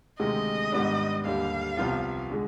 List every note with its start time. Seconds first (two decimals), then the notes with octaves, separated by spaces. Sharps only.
0.19 D2 C3 D#3 G#3 D#5
0.72 G#2 D#3 G3 B3 D4
1.25 D#2 D3 G3 F5
1.77 C2 C3 F3 B3 F4
2.30 D3 G#3